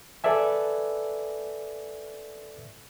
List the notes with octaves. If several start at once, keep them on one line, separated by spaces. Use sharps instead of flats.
A4 B4 D5 E5 G#5